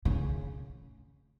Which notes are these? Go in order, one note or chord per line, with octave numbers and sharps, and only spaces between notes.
C#3